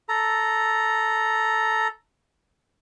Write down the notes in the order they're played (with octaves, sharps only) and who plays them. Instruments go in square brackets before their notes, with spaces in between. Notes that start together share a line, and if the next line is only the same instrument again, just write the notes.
[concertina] A4 A#5